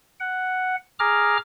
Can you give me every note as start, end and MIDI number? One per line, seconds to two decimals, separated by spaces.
0.20 0.76 78
0.99 1.37 68
0.99 1.37 82
0.99 1.37 86
0.99 1.37 89